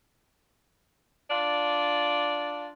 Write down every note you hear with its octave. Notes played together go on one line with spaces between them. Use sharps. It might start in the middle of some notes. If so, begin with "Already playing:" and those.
D4 F4 D5